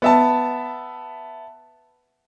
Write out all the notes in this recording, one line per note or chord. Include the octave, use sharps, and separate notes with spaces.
B3 E5 A5